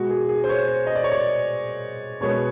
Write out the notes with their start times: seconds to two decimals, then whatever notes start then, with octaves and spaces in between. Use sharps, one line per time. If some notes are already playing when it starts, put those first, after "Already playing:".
Already playing: B2 G#3 B3 F#4
0.10 G#4
0.29 G#4
0.44 C5
0.49 C#5
0.68 C5
0.87 D#5
0.95 D5
1.04 C#5
1.12 D5
2.21 B2 G#3 B3 C#5